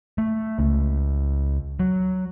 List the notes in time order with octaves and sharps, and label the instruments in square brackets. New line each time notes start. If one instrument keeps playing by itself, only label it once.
[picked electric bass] A3
C#2
F#3